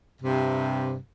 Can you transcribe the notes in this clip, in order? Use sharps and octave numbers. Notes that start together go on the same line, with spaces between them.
G2 C3